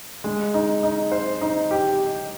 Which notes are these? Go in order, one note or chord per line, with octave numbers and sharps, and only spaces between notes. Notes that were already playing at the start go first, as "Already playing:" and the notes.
G#3
D#4
D#4
C5
D#4
G4